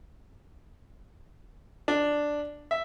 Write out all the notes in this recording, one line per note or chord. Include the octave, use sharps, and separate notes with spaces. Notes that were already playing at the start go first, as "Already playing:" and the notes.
D4
E5